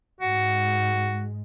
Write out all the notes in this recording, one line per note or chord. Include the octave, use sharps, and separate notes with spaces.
G#2 G#3 F#4